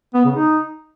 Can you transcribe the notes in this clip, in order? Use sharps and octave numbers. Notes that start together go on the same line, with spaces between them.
B3
C#3
D#4